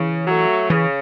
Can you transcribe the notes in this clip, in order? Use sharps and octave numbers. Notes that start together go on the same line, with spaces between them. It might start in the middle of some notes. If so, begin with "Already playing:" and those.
Already playing: C#3 E3
F#3 A3
C#3 E3